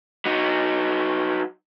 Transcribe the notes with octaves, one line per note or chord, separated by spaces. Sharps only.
F#3 D#4